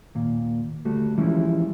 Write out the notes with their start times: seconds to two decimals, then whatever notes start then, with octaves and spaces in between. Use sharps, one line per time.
0.15 D#2 A#2
0.85 D2 G3 A3 F#4
1.18 E3 F3 G3 G#3 C#4 E4